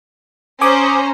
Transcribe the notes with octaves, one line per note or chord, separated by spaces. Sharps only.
C#4 C5 G#5 A#5 D6 D#6